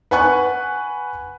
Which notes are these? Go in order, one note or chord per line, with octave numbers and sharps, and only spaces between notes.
B4 F#5 G#5 C#6 F#6